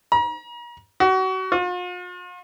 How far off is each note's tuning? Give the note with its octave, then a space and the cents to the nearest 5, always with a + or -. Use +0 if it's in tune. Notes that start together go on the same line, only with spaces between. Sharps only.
A#5 +40
F#4 +30
F4 +45